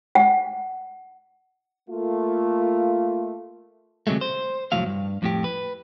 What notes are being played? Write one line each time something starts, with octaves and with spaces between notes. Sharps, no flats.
F#5
A3 A#3 F4
D2 C3 D#3 F#3 G#3 A3
C5
C2 F2 A2 F#3 F5
G2
F2 A2 G4
B4